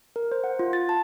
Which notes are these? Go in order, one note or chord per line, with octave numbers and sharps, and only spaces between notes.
A#4
C5
F#5
F4
A6
A5